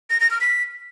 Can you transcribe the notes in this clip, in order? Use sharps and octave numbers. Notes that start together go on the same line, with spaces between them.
A#6
A#6
F6
B6